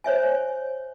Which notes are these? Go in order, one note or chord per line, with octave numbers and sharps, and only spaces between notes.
C5 C#5 E5 G#5